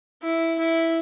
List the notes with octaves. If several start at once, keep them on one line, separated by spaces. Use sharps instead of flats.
E4
E4